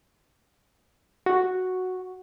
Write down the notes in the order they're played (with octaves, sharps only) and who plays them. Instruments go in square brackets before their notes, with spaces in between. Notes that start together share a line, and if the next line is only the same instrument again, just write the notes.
[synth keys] F#4